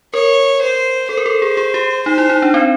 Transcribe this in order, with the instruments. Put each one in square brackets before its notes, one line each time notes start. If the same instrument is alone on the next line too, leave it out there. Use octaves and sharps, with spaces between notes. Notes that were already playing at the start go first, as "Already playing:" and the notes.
[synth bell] A#4 [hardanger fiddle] C#5
[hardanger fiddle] C5
[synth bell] A4 [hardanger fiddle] C5
[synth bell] A#4
A4
G#4
G#4
G4
[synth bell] D#4 [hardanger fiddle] C5
[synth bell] E4
D#4
D4
C4